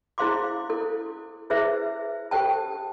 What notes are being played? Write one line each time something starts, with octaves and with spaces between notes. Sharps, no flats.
E4 G#4 C5 F5 C6 D6
E4 A4
E4 G#4 B4 C5 E5
G4 A4 C5 G5 A5